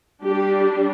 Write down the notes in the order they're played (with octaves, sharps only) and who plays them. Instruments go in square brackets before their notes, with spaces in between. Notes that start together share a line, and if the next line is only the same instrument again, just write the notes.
[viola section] G3 D4 G4